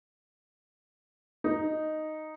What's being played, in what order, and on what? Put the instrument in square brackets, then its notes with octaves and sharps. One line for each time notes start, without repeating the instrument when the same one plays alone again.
[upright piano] D#4